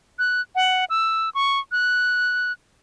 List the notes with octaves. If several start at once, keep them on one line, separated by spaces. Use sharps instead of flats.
F#6
F#5
E6
C#6
F#6